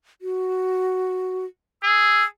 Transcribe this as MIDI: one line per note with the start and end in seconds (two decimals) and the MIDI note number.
0.22 1.45 66
1.83 2.26 68
1.83 2.25 88